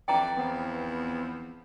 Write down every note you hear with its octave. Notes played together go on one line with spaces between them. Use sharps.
F2 E3 D5 G5 A#5
E2 F3 B3 C4